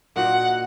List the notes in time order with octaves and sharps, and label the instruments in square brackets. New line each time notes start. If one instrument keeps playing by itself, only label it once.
[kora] A#2 A#3 D#4 F#4 [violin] F#5